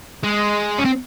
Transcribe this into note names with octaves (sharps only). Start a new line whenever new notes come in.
G#3
C#4
C4